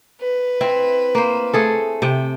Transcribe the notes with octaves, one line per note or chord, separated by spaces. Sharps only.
B4
C4 E4
A#3 C5
A3 G#4 A4
C3 G5